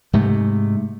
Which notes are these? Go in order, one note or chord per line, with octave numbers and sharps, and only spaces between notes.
G#2 C3 A3